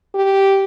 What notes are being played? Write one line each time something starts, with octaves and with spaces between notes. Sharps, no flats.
G4